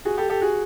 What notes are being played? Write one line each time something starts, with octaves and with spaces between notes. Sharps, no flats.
F#4 G#4
G4 A4
G4 A4
F#4 G#4